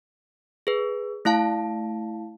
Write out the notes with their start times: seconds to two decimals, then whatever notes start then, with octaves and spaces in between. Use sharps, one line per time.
0.67 G#4 B4
1.25 A3 E4 F5 A5